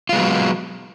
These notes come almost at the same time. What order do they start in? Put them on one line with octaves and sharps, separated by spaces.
F4 G#3 B3 F#3